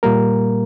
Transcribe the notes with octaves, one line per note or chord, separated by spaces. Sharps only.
A#2 G3 A#3 A#4